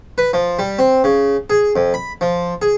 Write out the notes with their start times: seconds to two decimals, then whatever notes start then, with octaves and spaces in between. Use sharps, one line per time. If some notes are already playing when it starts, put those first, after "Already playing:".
0.18 B4
0.33 F3
0.59 G3
0.79 C4
1.04 C#3
1.50 G#4
1.76 F2
1.94 B5
2.21 F3
2.62 G#4